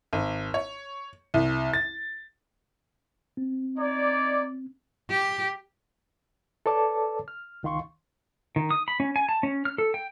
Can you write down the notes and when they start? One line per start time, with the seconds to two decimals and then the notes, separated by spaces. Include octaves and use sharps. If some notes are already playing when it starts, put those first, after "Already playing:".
0.13 G#1
0.54 C#5
1.34 C2
1.73 A6
3.37 C4
3.78 D#4 C#5 D5
5.10 G4
6.66 A4 B4 C#5 D5 A5 D6
7.28 F6
7.63 C#2 D#3 F5 C6 C#6
8.56 D#3
8.71 D#6
8.88 B5
9.00 C#4
9.16 G#5
9.29 A5
9.43 C#4
9.65 F6
9.78 A4
9.94 G5